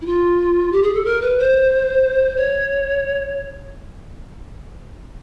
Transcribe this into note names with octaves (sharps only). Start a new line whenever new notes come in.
E4
F4
G4
G#4
A4
A#4
B4
C5
C#5